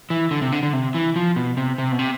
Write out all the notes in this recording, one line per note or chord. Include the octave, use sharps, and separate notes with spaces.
E3
D3
C3
D3
D3
C3
E3
F3
B2
C3
C3
B2
C3